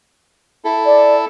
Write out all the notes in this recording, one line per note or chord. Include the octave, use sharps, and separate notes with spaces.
E4 A4
D5